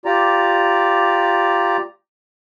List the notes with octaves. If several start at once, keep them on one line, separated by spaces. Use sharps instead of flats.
F4 G4 D5 A#5